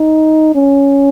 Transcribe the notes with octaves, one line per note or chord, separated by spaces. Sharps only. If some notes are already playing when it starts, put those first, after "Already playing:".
Already playing: D#4
C#4